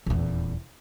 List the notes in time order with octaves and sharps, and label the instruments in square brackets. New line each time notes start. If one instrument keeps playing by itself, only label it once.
[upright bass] D#1 E2